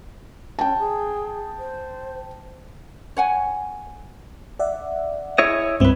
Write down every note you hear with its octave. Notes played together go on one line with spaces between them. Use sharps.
C#4 G5 A5
G#4
C5
C#5 F#5 G#5
D5 E5 F#5
E4 G#4 C#5 D#5
C2 G2 C4 E4 B4